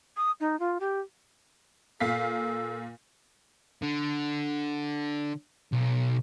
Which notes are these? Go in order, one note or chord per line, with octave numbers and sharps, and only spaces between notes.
D#6
D#4
F4
G4
A#2 A4 F5 B6
D3
B1